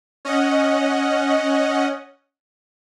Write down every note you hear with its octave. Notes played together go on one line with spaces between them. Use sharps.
C#4 D#5 F#5